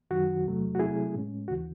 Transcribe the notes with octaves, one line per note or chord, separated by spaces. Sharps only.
F#2 D#3 F#3 F#4
E2 C3 F#3 A3
F#4
C3 F#3 A3 C4 E4 G#4
A2 G#3 C#4
D#2 C#3 E3 F#4